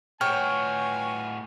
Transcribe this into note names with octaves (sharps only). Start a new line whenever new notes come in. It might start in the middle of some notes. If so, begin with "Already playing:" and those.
A2 F4 F#4 B4 C#5 G5 G#5 F6